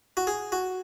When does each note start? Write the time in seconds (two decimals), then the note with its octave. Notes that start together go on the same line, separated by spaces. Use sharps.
0.17 F#4
0.27 G#4
0.52 F#4